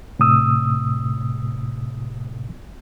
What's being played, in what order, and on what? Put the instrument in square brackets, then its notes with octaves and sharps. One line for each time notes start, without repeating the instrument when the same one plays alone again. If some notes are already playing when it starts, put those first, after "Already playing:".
[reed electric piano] A2 C3 D#6 E6